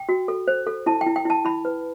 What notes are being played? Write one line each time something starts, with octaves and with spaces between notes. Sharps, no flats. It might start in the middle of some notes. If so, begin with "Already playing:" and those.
Already playing: G5
F#4
A4
C5
A4
E4 A5
G5
E4
G5
E4 A5
E4 B5
B4